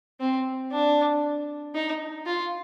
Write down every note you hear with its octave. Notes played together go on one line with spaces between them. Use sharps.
C4
D4
D#4
F4